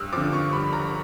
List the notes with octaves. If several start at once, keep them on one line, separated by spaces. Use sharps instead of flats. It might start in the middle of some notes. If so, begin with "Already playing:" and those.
Already playing: G2 D#6 E6 F#6
D3 F3 D6
C#6
G2 B5
A#5